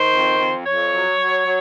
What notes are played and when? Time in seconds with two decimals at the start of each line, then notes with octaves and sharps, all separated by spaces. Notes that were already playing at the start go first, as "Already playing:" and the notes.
Already playing: D#3 C5
0.13 F2
0.39 F2
0.65 F2 C#5
0.92 F#3
1.19 F#3
1.46 F#3